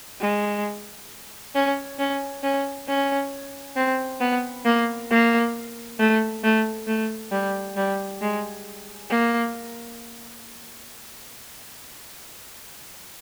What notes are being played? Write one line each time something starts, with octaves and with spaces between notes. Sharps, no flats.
G#3
C#4
C#4
C#4
C#4
C4
B3
A#3
A#3
A3
A3
A3
G3
G3
G#3
A#3